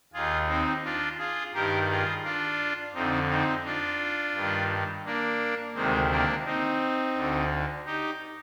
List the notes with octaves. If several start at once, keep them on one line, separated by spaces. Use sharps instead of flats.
D#2 D#3 F4 G#4
C4 D#4
D4 F4
F4 G#4
G2 D#3 G4 A#4
F4 G#4
D4 F4
F2 D3 C4 D#4
C4 D#4
D4 F4
G2 D#3
A#3 D4
D2 C3 D#3 G#3 C4
A#3 D4
C4 D#4
D2 D3
D#4 G4